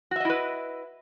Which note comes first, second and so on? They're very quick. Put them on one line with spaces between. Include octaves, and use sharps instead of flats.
F#4 E5 D#5 E4 B4